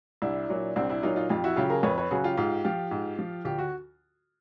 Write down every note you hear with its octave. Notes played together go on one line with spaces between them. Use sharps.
C2 D4 E4
A#2 F#3
C2 C4 D4
D4 E4
A#2 F#3 D#4 F4
D#4 F4
F2 F4 G4
E4 F#4
C#3 F#3 F4 G4
G#4 A#4
F2 B4 C#5
B4 C#5
C#3 F#3 F#4 G#4
F4 G4
G#2 F4 G4
F3 F4 G4
G#2
F3
D2 F4 G4
F#4